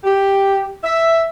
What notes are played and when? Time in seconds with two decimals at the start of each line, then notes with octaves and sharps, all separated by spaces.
0.04 G4
0.83 E5